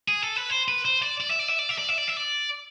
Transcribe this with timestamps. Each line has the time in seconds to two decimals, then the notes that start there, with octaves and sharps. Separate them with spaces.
0.08 G#4
0.22 A4
0.36 B4
0.50 C5
0.68 B4
0.85 C5
1.02 D5
1.21 D5
1.30 E5
1.39 D5
1.49 E5
1.59 D5
1.69 E5
1.78 D5
1.88 E5
1.98 D5
2.08 E5
2.17 D5